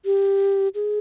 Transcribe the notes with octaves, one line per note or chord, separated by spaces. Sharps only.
G4
G#4